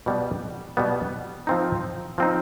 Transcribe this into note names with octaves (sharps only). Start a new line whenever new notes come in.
B2 G3 B3
B2 G3 B3
F3 C4 D#4
F3 C4 D#4